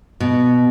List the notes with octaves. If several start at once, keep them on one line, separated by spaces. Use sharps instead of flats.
B2